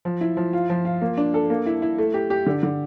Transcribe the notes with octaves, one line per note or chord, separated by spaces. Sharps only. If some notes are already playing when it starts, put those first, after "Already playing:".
F3
E4
F3
F4
F3
F4
A#3
D4
A4
A#3
E4
E4
A3
G4
G4
D3
D3